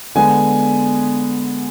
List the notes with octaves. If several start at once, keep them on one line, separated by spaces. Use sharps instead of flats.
D3 G#3 B3 G#5